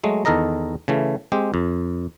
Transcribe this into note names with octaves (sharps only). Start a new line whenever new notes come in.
F#3 G#3 A3
E2 D#3 A4 A#4 D#5 A#5
C#3 E3 A3
G#3 C4 G4
F2